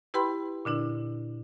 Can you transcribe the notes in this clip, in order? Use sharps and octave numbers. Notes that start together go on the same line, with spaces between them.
E4 G4 B4 G5 B5 C6
A#2 D3 D4 E4